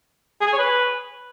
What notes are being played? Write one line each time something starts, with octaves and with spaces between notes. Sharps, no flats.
G#4
G#5
C#5
B4